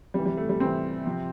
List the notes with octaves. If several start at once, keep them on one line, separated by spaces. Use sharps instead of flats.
C3 E3 G3
G3
A3
G3
C3 E3 C4
C3 F3